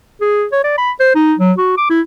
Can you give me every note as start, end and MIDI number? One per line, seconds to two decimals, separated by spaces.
0.21 0.45 68
0.52 0.62 73
0.64 0.76 74
0.78 0.92 83
1.00 1.12 72
1.15 1.34 63
1.39 1.52 54
1.58 1.76 66
1.78 1.87 86
1.90 2.01 64